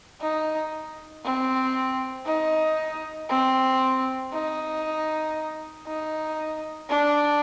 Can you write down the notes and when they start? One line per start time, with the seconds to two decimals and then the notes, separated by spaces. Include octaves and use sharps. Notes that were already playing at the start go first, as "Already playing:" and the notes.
0.21 D#4
1.24 C4
2.26 D#4
3.30 C4
4.32 D#4
5.87 D#4
6.89 D4